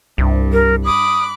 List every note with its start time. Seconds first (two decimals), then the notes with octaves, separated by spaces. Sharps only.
0.18 C2 G2
0.53 A#4
0.85 B5 D6 D#6 F#6